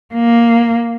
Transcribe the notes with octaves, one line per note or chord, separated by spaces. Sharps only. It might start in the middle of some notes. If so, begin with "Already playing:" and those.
A#3